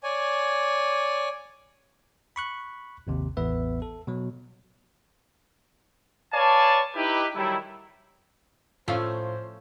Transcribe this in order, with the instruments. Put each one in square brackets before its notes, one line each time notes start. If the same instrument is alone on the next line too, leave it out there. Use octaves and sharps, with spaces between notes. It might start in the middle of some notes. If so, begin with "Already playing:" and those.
[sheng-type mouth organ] C#5 D5 G#5
[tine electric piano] B5 C#6 F#6
G#1 D#2 C3
A1 E2 B3 B4 E5
A4
B2 F#3
[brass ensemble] B4 C#5 D5 F5 G#5 A5
D#4 E4 G4 B4
D#3 F#3 G3 A3 E4
[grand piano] A2 E6 [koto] F3 A3 C#4 [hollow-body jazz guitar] F4 F5 [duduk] C5